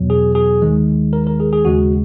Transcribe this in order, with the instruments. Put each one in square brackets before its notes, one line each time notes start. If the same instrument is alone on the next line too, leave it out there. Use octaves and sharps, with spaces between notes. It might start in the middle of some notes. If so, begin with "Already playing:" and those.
Already playing: [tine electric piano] E2 B2 F#3
G#4
G#4
D#2 D#3 G#3
A#4
A#4
G#4
G#4
D#2 C#3 G#3 F#4